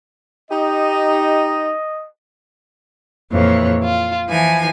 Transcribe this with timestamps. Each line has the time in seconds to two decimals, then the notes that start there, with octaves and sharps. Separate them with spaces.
0.51 D#4 G4 D#5
3.32 F2 A#2 E3 C#5
3.84 F4
4.29 E3 F3 G#5